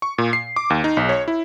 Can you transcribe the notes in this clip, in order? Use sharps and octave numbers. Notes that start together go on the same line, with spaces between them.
C#6
A#2
C7
D6
D#2
D#4
B1
C#5
E4